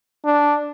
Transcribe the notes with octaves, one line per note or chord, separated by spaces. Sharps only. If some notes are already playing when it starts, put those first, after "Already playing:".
D4